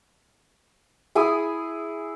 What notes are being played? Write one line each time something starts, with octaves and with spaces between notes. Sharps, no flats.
E4 G#4 G#5 D#6